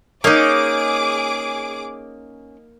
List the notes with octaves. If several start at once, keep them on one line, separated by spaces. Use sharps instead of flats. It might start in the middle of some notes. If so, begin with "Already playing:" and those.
A#3 C#4 D#4 G#4 C#5 D#5 D6